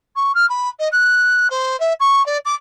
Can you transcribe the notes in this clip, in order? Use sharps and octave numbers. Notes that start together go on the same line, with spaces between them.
C#6
F6
B5
D#5
F#6
C5
E5
C#6
D5
D6